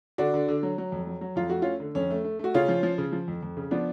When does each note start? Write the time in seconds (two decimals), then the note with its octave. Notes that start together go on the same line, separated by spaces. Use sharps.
0.18 D3 D4 F#4
0.34 D3
0.48 D3
0.63 F#3
0.78 F#3
0.92 F2
1.07 F#3
1.21 F#3
1.36 F2 F4
1.49 A3 F#4
1.62 A3 C#4 F4
1.80 D3
1.95 F2 C#4
2.10 A3
2.24 A3
2.39 A3 F#4
2.54 C#3 C#4 F4
2.68 F3
2.83 F3
2.98 C#3
3.12 F3
3.28 F2
3.43 F2
3.57 C#3
3.71 F3 B3 D4